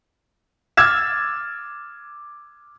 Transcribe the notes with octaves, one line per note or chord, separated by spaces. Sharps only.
D6 E6 F6 G#6 A6 E7